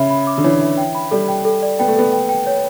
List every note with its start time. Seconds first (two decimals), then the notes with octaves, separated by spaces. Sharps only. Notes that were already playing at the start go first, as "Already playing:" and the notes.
Already playing: C#3 C#5 E5 B5
0.10 B5
0.27 D6
0.38 D3
0.44 E3 C#5
0.61 E5
0.77 G5
0.95 B5
1.11 G3 A4
1.28 G5
1.45 A4
1.62 D5
1.79 B3 G5
1.88 A3
1.96 B3 A4
2.13 G5
2.29 G5
2.47 C#5